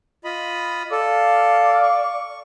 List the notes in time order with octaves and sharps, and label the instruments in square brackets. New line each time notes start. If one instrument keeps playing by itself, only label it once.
[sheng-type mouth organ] F4 D#5 B5
[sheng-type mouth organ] A4 [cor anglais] D5 [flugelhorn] F5
[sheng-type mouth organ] C#6